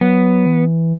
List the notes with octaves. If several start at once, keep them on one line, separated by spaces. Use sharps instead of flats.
F#3 B3
E3